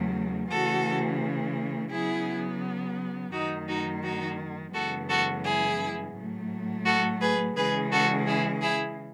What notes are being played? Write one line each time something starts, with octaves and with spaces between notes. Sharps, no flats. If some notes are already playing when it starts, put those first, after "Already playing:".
Already playing: E2 C#3 F#3 A3
C#3 E3 A3 F#4 A4
C#3 F#3 B3 E4 G#4
F#2 D#3 A3 D#4 F#4
D#4 F#4
D#4 F#4
F#2 C#3 E3 G#3 B3 F#4 A4
F#4 A4
E4 G#4
A2 F#3 A3
F#4 A4
G#4 B4
C#3 E3 G#3 G#4 B4
F#4 A4
E4 G#4
E4 G#4